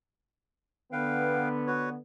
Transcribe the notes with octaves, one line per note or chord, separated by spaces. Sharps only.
D3 B3 B4 F5 G5
F#4 B4 C#5